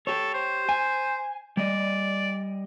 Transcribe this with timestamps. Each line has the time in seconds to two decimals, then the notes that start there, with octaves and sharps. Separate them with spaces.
0.07 G4 A4 C#5
0.34 C5
0.69 G#5
1.57 G3 D5 D#5